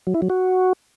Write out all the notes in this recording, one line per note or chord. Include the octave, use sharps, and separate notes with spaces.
F#3
E4
F#3
F#4